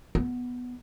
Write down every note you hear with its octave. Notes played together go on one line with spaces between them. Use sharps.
B3